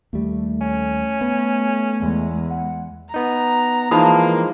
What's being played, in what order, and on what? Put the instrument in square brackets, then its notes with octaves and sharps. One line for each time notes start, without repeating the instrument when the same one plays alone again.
[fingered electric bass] D#2 G3 [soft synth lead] A3
[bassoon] C#4
[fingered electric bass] B3
[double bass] E2 G#3
[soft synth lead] F#5
[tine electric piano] B3 D#4 [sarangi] A#5
[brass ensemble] E3 A#3 [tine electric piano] F3 G#3 [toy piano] D#4 B5 D#6